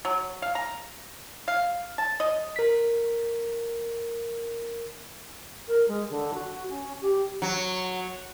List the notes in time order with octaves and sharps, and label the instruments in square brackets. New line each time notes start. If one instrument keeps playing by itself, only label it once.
[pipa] F#3
F5
A#5
F5
A5
D#5
[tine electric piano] A#4 B6
[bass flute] A#4
G#3
D3
F#4
C#4
G4
[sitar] F#3